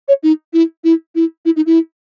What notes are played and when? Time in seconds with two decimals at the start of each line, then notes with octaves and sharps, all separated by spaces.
0.08 C#5
0.23 D#4
0.53 E4
0.84 E4
1.15 E4
1.45 E4
1.56 D#4
1.66 E4